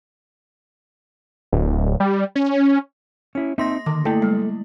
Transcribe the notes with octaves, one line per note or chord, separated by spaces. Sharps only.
D1
G3
C#4
C#4 E4
A#3 C4 D#4 E5 C6 A#6
D3 D#3 D6
A3 A#3 E4 A4 G5 A5
G3 G#3